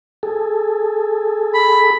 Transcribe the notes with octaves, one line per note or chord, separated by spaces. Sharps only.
G#4 A4
B5